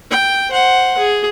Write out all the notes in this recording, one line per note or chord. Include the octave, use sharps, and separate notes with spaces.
G5
C5 F#5
G#4